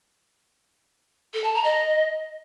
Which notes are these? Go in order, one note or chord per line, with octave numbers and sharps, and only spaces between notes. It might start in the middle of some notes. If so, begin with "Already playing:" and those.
A4
A5
A#5
D#5